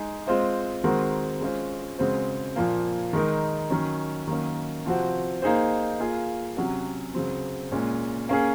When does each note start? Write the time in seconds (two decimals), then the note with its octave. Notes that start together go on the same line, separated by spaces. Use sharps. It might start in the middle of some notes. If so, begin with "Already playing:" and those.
Already playing: G#3 D#4 G#4
0.27 G#3 C4 F4 C5 D#5
0.84 D#3 G#3 C4 F#4 A#4
1.41 G#3 C#4 F4 C5
1.98 C#3 G#3 C4 F#4 C5
2.56 A#2 F3 A#3
3.13 D#3 G#3 D#4 A#4
3.70 D#3 F#3 C#4
4.27 D#3 F#3 A#3 C#4
4.85 C3 F3 C4 F#4
5.42 A#3 D#4 G#4 C5
5.99 A#3 F4 G#4
6.57 C3 F#3 C#4 F#4
7.14 C#3 F#3 C4
7.72 A#2 G#3 C#4
8.29 A#3 C#4 G#4